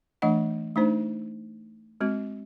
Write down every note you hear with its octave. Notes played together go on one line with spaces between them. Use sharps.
E3 A3 D4 D#5 F#5
A3 D4 D#4 C5
G#3 C4 F#4